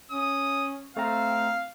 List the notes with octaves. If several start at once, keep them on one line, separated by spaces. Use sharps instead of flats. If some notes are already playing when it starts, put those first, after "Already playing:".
C#4 D#6
A3 C4 F5 A#5